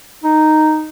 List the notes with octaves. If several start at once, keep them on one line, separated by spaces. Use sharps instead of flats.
D#4